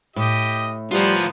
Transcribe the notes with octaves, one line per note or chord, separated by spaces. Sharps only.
A2 G4 D#5
F3 G3 A#3 B3 F4 C5